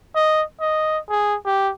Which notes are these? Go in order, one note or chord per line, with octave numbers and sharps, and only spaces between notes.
D#5
D#5
G#4
G4